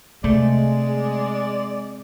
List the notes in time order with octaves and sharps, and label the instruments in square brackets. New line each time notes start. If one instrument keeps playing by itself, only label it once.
[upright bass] C3 [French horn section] G#3 [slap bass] A3 [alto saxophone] D5